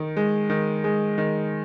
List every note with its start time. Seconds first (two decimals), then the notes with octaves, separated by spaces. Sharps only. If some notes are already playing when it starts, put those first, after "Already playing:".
Already playing: D#3
0.17 G#3
0.50 D#3
0.84 G#3
1.18 D#3